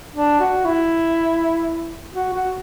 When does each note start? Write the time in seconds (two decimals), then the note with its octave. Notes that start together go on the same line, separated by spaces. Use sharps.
0.14 D4
0.40 F#4
0.65 E4
2.14 F#4
2.34 F#4